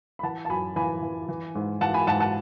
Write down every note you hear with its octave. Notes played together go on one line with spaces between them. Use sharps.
B5
E3 F#5 A5
A5
F#2 G#5 B5
E3 G#5 B5
E3
E3
G#2
E3 F#5 A5
G#5 B5
G#2 F#5 A5
F#5 A5